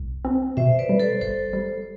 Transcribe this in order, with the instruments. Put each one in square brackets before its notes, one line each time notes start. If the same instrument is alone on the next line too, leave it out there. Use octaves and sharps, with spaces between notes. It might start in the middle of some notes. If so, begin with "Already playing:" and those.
Already playing: [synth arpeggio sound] C2
C4
[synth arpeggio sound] B2 [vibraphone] C5 E5
[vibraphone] B4 D5
[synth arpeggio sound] G3
[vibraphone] A4 C5
[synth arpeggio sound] G1 [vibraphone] A4 C5
[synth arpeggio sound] G3